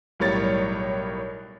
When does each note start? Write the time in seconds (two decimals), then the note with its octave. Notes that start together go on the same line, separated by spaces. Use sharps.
0.20 B1 A2 G3 A#4 C#5 A6